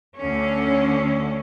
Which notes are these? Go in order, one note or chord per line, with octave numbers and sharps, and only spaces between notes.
D2 D3 C#4